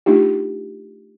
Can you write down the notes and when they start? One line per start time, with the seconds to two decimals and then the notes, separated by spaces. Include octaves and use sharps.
0.06 A3 D4 D#4 F4 G4